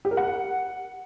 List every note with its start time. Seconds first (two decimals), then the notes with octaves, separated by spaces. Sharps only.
0.05 G4
0.11 A#4
0.17 F#5